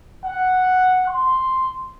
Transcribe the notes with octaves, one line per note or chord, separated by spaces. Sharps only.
F#5
C6